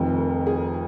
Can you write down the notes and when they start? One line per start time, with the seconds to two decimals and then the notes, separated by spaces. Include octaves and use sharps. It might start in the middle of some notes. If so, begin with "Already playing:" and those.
Already playing: F1 F2 D#3
0.18 A#4
0.47 G#4